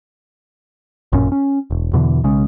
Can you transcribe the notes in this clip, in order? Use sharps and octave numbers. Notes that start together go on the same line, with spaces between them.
A1 F#2 A#2 C#4
C#4
E1
E2 B2 D3 E3
B1 C#3 G#3 C#4